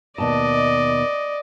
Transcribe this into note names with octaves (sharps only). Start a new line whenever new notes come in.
D#2 B2 D5 D#5 A5